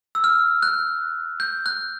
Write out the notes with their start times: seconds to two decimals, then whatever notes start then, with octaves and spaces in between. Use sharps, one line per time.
0.15 E6
0.24 F6
0.63 F#6
1.40 G6
1.66 F#6